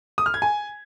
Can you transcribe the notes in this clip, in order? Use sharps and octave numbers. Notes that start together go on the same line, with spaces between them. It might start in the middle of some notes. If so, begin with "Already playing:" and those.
D#6
F6
G#6
G#5